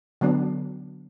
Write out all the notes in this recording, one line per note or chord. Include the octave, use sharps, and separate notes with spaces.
D3 F#3 B3 D4